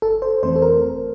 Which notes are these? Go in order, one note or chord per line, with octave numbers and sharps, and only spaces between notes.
G1 A4
C5
F2 E3 A3 C4 C5
A4
A#4
G1